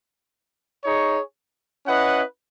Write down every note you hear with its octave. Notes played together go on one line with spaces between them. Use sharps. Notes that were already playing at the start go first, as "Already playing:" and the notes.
D#4 G#4 C#5
C#4 E4 B4 D#5 F#5